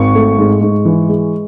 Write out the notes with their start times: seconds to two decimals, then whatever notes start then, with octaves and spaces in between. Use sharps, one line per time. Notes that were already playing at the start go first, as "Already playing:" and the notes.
Already playing: G#1 C#6
0.15 A3
0.39 G#2
0.61 G#2
0.85 E3
1.09 G#3